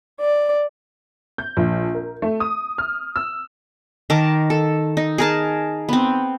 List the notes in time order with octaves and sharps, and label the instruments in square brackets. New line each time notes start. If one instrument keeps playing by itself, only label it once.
[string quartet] D5
[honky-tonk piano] G6
A#1
A#4
A3
D#6
F6
E6
[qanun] D#3 A#4 A5 D6
A4
D#4
G#4 A#4 A5
B3 C4